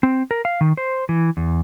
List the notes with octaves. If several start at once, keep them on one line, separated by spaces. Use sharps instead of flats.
C4
A#4
F5
D#3
C5
E3
E2